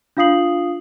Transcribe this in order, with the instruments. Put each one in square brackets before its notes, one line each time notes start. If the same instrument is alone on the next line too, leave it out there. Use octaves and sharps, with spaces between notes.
[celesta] D4 F4 F5 D#6 C7 F#7